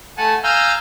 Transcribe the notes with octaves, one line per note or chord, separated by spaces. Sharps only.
A3 F#5 G#5 A5
F5 G#5 A#5 E6 F6 G6